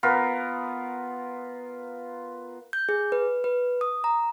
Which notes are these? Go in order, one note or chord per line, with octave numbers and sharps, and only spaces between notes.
B3 F4 A#4
G6
G#4
B4
B4
D#6
A#5